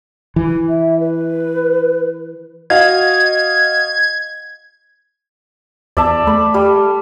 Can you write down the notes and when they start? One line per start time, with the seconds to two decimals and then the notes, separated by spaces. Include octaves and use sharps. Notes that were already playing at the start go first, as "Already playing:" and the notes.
0.36 E3
0.69 E5
1.00 B4
2.70 F#4 D#5 F5 G#6
5.97 E2 D5 E5 A5
6.27 A3 B5
6.54 G3